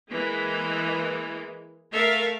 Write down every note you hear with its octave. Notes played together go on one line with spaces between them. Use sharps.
E3 G#3 A#3
A3 A4 A#4 E5 F5